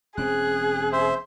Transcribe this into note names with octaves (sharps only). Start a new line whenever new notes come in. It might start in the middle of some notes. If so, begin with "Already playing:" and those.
E1 C4 C#4 G#4 F#6
C5 E5